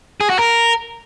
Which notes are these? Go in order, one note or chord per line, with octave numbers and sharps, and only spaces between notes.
G#4
F#4
A#4